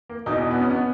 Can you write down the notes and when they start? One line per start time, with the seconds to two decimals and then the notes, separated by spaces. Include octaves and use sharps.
0.09 A#3
0.26 E1 E2 B2 D#4
0.51 B3
0.60 C#4
0.70 B3